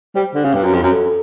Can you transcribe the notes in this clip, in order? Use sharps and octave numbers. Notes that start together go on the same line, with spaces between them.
G3 C5
D3
C#3
G2 B4
F#2
F2
F#2
A4